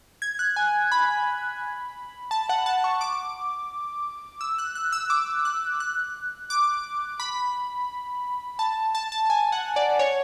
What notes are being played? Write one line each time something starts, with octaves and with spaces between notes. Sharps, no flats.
G#6
F#6
G#5
B5
A5
F#5
A5
C#6
D6
E6
F#6
F#6
E6
D6
F#6
F#6
D6
B5
A5
A5
A5
G#5
F#5
D5
C#5